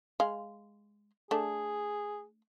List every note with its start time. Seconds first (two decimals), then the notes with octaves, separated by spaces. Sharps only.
0.20 G#3 F5
1.31 A3 D4 G#4